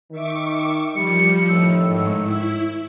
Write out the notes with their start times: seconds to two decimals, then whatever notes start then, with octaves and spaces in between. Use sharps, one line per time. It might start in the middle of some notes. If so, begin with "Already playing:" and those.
0.11 D#3 E5 C#6 D6
0.96 F3 G3 C#7
1.49 F2 A2 D#3 E6
1.88 G#2 C#6
2.22 E4